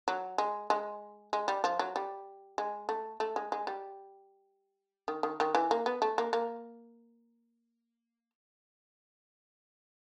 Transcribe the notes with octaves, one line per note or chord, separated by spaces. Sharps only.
F#3
G#3
G#3
G#3
G3
F3
F#3
G3
G#3
A3
A3
G#3
G#3
G3
D#3
D#3
D#3
E3
A#3
B3
A3
A#3
A#3